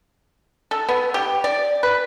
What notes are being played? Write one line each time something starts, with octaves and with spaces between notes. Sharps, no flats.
A4
B3
G4
D5
B4